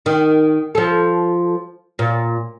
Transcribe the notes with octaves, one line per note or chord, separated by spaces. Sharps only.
D#3
F3 A4
A#2